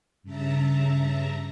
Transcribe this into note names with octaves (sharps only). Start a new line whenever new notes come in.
G2 C#3 E5 A5 A#5